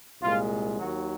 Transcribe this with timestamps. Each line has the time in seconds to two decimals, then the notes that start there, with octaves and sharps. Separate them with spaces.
0.22 C2 A#2 G#3 F4
0.79 D#2 D#3 F#3 F#4